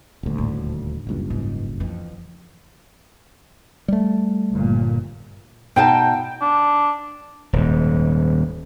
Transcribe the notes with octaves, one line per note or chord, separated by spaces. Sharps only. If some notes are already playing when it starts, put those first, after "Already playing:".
D#1 D2
A2
F#1 C#2 G2
G#2
F2 E3
G3 A3
G1 A#2
B2 D#4 G5 A5
D4
D#1 G#2